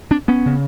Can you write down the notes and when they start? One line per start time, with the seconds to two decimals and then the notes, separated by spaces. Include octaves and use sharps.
0.11 C4 D4
0.28 B3 C#4
0.46 C#3